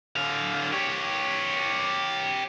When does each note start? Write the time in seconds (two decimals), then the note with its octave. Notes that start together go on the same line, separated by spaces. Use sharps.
0.16 D3 F5
0.72 G4 C#5